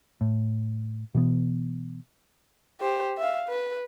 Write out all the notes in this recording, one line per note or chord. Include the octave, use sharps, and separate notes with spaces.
A2
B2 E3 B3
G4 C5
E5 F5
B4